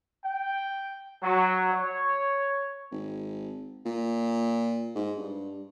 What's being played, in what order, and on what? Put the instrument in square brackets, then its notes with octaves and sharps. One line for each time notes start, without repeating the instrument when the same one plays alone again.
[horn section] G5
F#3
C#5
[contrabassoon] G#1
A#2
G#2
G2